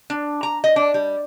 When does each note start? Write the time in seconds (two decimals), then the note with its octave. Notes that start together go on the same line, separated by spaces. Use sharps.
0.10 D4
0.43 A#5
0.64 D#5
0.76 D4
0.94 G3